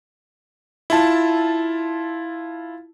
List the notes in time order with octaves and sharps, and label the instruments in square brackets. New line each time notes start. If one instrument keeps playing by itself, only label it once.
[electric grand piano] E4 F4 A5